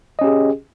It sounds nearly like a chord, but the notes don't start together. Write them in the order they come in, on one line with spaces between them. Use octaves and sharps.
D#5 C#4 G4 G#4